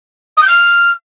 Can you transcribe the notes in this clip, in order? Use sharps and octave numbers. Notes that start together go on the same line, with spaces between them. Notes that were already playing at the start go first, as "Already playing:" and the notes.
D#6
G6
F6